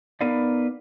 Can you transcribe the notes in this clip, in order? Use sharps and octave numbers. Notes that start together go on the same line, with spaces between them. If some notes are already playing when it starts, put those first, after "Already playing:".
B3 D#4 A#4 B4 D5 F5